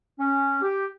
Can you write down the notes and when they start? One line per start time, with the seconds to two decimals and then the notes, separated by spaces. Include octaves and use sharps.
0.19 C#4
0.62 G4